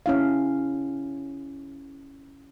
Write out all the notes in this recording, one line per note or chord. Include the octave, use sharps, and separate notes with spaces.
C#4 E4 F5